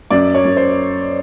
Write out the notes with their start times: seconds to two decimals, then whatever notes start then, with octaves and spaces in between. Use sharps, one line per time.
0.10 F#2 D5
0.34 C#5
0.45 F#2
0.57 C5